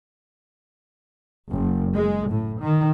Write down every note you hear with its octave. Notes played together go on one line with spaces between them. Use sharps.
F#1
G#3
A2
D#3